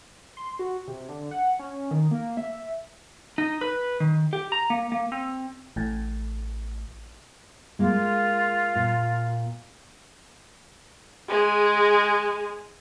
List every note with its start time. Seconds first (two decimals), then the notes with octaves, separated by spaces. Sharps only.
0.37 C6
0.59 F#4
0.88 C3
1.09 D3
1.31 F#5
1.59 C#4
1.91 D#3
2.11 A#3
2.37 E5
3.38 D#4
3.61 B4
4.00 D#3
4.33 G4
4.52 A#5
4.70 A#3
4.92 A#3
5.12 C4
5.76 A1 A2
7.79 G#3 A#3 F4
8.76 A#2
11.29 G#3 G#4